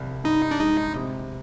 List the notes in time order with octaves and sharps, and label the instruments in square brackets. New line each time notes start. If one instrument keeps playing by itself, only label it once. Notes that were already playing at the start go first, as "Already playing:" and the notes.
Already playing: [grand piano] C2 G3
[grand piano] G2 [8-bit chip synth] D#4
[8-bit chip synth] D4
[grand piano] G#3 [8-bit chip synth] D#4
[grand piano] C3